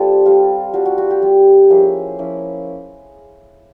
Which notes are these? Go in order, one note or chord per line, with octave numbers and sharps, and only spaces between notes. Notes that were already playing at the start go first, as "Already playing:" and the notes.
Already playing: G3 C4 F4 A4
G3 C4 F4
G3 C4 F4 F#4
F#4
F#4
G4
G3 C4 F4
F3 A#3 C#4 E4 G#4
F3 A#3 C#4 E4